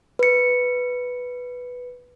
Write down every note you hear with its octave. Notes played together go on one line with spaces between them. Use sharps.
B4 C#7